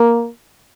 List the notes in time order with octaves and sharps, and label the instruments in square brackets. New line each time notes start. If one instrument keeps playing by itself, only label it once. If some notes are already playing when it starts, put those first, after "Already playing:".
Already playing: [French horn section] A#3